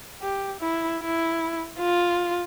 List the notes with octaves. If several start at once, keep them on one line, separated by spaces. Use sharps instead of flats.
G4
E4
E4
F4